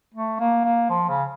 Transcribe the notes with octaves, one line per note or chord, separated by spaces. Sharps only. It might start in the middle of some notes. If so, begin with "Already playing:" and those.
A3
A#3
A#3
F3
C#3